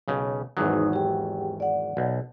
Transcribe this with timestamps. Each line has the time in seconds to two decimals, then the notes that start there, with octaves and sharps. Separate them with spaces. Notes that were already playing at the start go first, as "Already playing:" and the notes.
0.08 B1 C#3
0.57 G#1 E2 F#3 D#4 B4 D#6
0.93 G4 G5
1.60 D5 F#5
1.97 B1